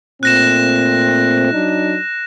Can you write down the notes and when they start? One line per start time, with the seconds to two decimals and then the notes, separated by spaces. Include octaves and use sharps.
0.23 A#2 A3 C4 F#6 A#6 E7
1.53 F#3 D4 D#4